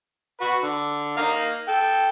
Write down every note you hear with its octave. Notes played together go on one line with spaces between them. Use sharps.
F#4 B4
D3
A#3 D#4 F5
A4 G5